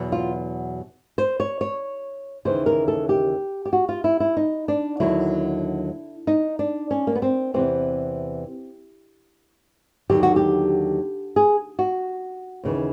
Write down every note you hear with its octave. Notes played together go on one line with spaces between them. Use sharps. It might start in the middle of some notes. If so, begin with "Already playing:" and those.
Already playing: E2 B2 F#3
F4
C5
C#5
C#5
D#2 C#3 E3 C5
A#4
A4
G4
G4
F#4
F4
E4
E4
D#4
D4
D#2 D3 F#3 E4
D#4
D4
C#4
A#3
B3
C4
E2 C3 E3 C4
D#2 D3 F#3 G4
F#4
G4
G#4
F#4
D#2 C#3 E3